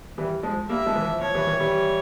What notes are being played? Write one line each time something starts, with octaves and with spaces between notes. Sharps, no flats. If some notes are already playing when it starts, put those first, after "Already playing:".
E3 G3
F3 G#3
G3 A#3 E5
F3 G#3
E3
F3
F3 C#5
E3 G3
E3 G3
E3 G3